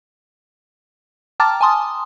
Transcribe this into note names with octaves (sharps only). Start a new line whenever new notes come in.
G5 A5 A#5 D6 F6 A6
G#5 A5 C6 D#6